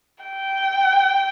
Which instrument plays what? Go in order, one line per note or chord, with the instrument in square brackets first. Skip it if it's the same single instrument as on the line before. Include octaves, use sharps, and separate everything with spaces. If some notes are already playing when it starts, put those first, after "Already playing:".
[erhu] G5